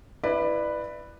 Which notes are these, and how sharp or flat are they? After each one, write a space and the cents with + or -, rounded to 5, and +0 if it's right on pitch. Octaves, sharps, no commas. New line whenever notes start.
E4 +0 B4 +0 D5 +25